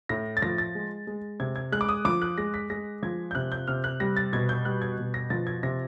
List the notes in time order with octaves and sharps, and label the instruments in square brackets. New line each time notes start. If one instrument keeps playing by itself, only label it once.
[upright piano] A2 A#6
A6
F3 A#6
A6
G#3
G#3
C3 G#6
G#6
G#3 F#6
D6
D#6
F3 D6
F#6
G#3 A#6
B6
G#3 A#6
F3 G#6
G6
C3 F#6
G6
C3 F6
F#6
G3 A#6
A6
B2 G#6
G6
G3 F#6
G#6
B2
A#6
F3 A6
G#6
C3 A#6